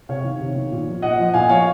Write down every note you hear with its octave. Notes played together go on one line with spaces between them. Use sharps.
C3 C#5 F5
D#3
C3
D#3
A#2
F3
A#2 D#5 F#5
F3
A#2 F5 G#5
F3 C#5 F5